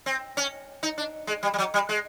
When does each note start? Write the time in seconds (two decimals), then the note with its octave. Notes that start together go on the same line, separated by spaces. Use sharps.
0.06 C4
0.37 C#4
0.83 D#4
0.98 D4
1.27 G#3
1.43 G3
1.54 G3
1.58 F#3
1.74 G3
1.89 G#3